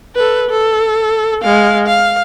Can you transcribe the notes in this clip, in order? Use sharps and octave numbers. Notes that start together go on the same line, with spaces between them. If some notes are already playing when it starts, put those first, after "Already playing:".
A4 B4
A4
G#3 F5
F5